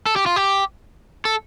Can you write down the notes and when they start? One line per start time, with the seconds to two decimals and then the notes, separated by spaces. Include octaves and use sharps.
0.06 A4
0.16 G4
0.26 F4
0.36 G4
1.25 A4